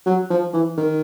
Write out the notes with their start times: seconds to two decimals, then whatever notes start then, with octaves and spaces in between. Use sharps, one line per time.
0.06 F#3
0.30 F3
0.54 E3
0.78 D#3